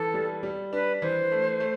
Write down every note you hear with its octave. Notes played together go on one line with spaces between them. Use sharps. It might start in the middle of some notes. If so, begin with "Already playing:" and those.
Already playing: E3 A4
G3
G3
D4 B4
E3 C5
A3
A3